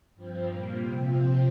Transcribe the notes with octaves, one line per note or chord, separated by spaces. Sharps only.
G2 F3 C4
A#2 G3 A#3 A#5
C3 F3 C4 G5
C3 F3 C4 F5